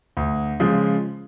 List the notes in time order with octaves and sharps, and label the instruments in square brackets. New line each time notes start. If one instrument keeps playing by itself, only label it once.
[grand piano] D2
C#3 F3 G#3